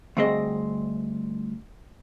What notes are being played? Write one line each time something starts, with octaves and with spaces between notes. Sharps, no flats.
D2 G2 C4 G#4 D#5